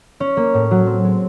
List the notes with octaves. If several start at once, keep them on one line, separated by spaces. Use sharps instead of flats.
C#4
A#3
A2
F#3
C4
G#3